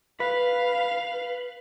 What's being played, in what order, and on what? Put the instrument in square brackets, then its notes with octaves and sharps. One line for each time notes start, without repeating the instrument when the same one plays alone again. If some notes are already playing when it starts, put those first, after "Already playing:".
[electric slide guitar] B4 [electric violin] F5